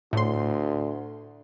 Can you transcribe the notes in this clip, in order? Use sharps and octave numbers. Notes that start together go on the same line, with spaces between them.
D2 A2 C6